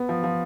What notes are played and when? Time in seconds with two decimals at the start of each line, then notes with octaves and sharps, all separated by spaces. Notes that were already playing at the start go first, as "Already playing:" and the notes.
Already playing: B3
0.09 F3
0.24 F3